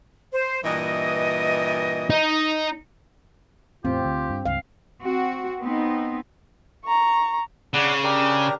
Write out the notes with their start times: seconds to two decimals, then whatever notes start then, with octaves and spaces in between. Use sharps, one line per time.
0.33 C5
0.64 G2 A#2 E3 D#5
2.10 D#4
3.85 E2 A2 C4 F4 G4
4.05 D2
4.30 G2
4.46 C#2 G2 F5
5.01 C4 F#4
5.61 B3 C4 D#4
6.85 A#5 C#6
7.74 C#3 D4 F#5
8.04 D4 G4 A#4